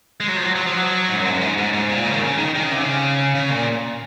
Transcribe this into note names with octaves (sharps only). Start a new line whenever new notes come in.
G#3
F#3
F3
F#3
F#3
F3
F#3
G#2
F#2
G#2
F#2
G#2
G#2
G#2
A#2
C#3
D#3
C#3
D#3
D#3
C#3
C3
C#3
C#3
A#2